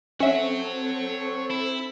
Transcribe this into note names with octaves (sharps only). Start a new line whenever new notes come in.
C4 C#4 A4 C5 C#5 E5 F#5
E4